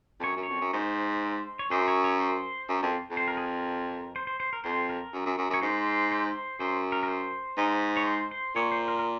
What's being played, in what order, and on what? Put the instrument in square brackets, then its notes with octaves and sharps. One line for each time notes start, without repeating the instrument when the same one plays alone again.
[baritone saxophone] F2
[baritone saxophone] F#2 [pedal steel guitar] C#5
[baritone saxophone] F#2
[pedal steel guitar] C#5
[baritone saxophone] F2
F#2
[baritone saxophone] G#2 [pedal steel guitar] C5
[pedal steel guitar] C#5
[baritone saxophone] F#2 [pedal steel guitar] C5
[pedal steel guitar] C#5
C#5
C5
[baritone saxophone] F#2
F2
F2
[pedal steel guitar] C5
A#4
G#4
A#4
C5
C5
C5
A#4
[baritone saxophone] F2 [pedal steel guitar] C5
[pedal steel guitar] A#4
[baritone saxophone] F#2
F#2
F#2
F#2
[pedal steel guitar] C#5
[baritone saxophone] G#2 [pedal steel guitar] C5
[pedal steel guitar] C5
[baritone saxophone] F#2 [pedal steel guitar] C5
[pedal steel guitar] A#4
A#4
C5
[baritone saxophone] G#2
[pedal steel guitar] C#5
C5
C5
[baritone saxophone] A#2 [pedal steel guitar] C#5
[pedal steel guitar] C5
A#4
A#4